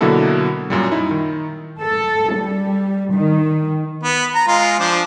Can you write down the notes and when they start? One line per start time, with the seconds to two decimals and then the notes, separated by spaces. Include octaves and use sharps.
0.01 B2 D3 F#3 A#3 E4 A4
0.70 F#2 A#2 G3
0.92 D#4 E4
1.11 D#3
1.82 A4
2.36 G3
3.13 D#3
4.03 B3
4.35 A#5
4.47 G#3 F4
4.79 F3 D4 C5